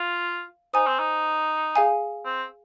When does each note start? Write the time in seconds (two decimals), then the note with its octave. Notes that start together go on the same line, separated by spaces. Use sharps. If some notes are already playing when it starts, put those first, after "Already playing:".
Already playing: F4 F5
0.73 D#4 C5 G#5 D#6
0.87 C4
0.99 D#4
1.76 G#4 F5 G#5
2.25 C4